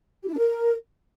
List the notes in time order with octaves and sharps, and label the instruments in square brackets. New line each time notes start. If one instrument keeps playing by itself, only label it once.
[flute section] G4
E4
D4
A#4